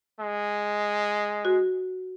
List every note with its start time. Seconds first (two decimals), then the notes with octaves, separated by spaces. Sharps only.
0.20 G#3
1.45 F#4